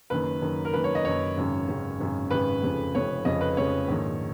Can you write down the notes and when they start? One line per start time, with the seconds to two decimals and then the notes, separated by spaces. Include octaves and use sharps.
0.10 F#1 F#2 D#3 B4
0.42 F#1 F#2 D#3
0.65 A#4
0.73 F#1 F#2 D#3 B4
0.84 C#5
0.95 D#5
1.05 F#1 F#2 D#3 C#5
1.37 G#1 F#2 C#3
1.68 G#1 F#2 C#3
2.00 G#1 F#2 C#3
2.30 G#1 F#2 C#3 B4
2.63 F1 F2 C#3
2.95 F1 F2 C#3 C#5
3.25 F1 F2 C#3 D#5
3.41 B4
3.57 F1 F2 C#3 C#5
3.88 A#1 G#2 D#3